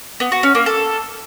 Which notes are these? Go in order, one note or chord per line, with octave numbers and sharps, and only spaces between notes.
B3
F#4
C#4
A#3
A4